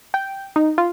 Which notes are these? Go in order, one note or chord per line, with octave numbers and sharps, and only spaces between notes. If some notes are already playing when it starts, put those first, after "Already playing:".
G5
D#4
F4